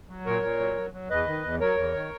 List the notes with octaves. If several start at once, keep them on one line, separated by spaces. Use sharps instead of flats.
F#3
A#2 A#4 C#5
A#2
F#3
F#3
F#3
E2 B4 D#5
D#3
E2
F#3 A#4 C#5
E2
D#3